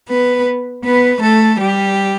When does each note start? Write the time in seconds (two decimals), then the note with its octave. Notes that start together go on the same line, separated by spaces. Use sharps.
0.09 B3 B4
0.85 B3 B4
1.22 A3 A4
1.60 G3 G4